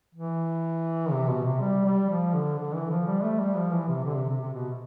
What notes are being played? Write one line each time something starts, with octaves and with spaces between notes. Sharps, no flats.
E3
C3
B2
C3
G3
G3
F3
D3
D3
E3
F3
G3
A3
G3
F3
E3
C3
D3
C3
C3
C3
B2